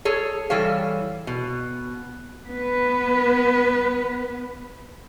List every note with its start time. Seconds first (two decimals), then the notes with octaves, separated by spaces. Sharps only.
0.05 G#4 A4 C#5
0.50 E3 G3 A4 C#5 F5
1.27 B2
2.48 B3 B4